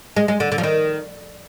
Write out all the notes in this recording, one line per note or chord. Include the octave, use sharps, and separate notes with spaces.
G#3
G#3
D3
D3
F3
D#3